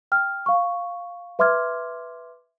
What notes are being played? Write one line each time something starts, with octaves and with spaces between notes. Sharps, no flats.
G5 F6
F5 C#6
B4 E5 C6 D6 F6 G#6